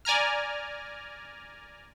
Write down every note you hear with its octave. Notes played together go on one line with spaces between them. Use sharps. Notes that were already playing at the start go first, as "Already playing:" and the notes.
D5 G#5 A#5 F6